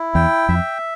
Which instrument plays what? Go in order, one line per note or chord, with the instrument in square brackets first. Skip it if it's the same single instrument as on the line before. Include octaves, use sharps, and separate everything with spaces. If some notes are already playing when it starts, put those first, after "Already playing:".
Already playing: [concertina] E4
[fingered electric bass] E2 [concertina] G5
[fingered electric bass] F2 [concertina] E5